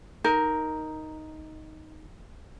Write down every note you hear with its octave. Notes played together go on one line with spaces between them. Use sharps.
D#4 A#4